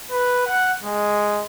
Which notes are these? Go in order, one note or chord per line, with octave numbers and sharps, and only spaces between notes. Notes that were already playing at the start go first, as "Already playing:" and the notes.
B4
F#5
G#3